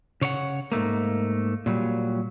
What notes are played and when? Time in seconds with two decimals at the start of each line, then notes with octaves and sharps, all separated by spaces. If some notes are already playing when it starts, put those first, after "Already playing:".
0.21 C#3 C#5 D5 F#5
0.72 G#2 B2 A3 A#3
1.66 A#2 F#3 G3